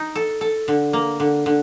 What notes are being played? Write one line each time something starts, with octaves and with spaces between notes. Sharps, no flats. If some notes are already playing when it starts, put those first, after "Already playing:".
Already playing: D#4
A4
A4
D3
A#3
D3
D3